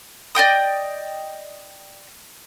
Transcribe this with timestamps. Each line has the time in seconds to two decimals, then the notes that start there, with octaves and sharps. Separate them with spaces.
0.35 D5 D#5 G5 D#6